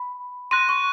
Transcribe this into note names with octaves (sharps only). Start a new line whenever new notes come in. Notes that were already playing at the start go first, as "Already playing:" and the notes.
Already playing: B5
C6 F#6 A#6 D#7
C#6